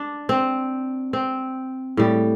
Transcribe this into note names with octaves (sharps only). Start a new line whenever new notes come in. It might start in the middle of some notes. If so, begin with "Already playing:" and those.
Already playing: D4
C4
C4
A2 G3